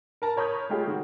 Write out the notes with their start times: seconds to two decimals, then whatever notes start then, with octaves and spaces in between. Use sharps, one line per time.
0.22 A#4 A5 A#5
0.36 A#4 C#5 B5 D#6 G6
0.69 G#3 A3 F4 G4 G#4
0.88 D#3 F#4